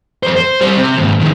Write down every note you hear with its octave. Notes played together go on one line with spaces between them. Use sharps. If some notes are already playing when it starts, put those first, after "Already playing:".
F2 C5
C5
G3 C5
C3
D#2 G#2
F2 D#3